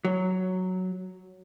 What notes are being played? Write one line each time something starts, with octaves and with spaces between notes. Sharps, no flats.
F#3